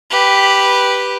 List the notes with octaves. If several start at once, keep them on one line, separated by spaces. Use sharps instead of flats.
G4 B4